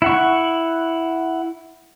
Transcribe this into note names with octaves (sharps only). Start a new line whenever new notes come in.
E4 F#5 C#6